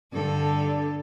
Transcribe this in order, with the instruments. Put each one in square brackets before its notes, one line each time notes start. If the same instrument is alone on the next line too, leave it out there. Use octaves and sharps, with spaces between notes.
[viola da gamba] G2 D3 A4